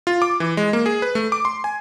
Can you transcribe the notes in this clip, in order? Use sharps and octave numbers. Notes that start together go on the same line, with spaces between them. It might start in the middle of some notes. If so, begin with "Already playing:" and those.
F4
D6
E3
G#3
A#3
G#4
B4
A3
D6
C6
G#5